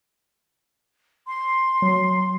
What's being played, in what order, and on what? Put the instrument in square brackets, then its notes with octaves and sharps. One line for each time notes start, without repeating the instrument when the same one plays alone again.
[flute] C6
[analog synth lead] F#3